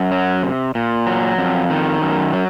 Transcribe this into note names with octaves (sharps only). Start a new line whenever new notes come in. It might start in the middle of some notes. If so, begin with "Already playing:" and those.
Already playing: F#2
F#3
C3
A#2
F#3
F2
D#3
F#2
F#3